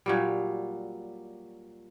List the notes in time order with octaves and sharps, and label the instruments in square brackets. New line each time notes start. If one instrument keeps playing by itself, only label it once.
[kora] A#2 F#3 G3